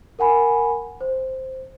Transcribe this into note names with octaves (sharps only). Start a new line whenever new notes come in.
A#4 F#5 G#5 B5
C5